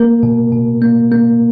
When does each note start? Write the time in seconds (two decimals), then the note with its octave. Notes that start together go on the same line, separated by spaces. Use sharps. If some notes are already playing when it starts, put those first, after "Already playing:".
Already playing: A#3 A#4
0.23 B2
0.52 B2
0.82 A#3
1.12 A#3